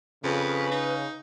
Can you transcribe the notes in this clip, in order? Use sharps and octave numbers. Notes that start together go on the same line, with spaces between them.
F2 C#3 B4
D#4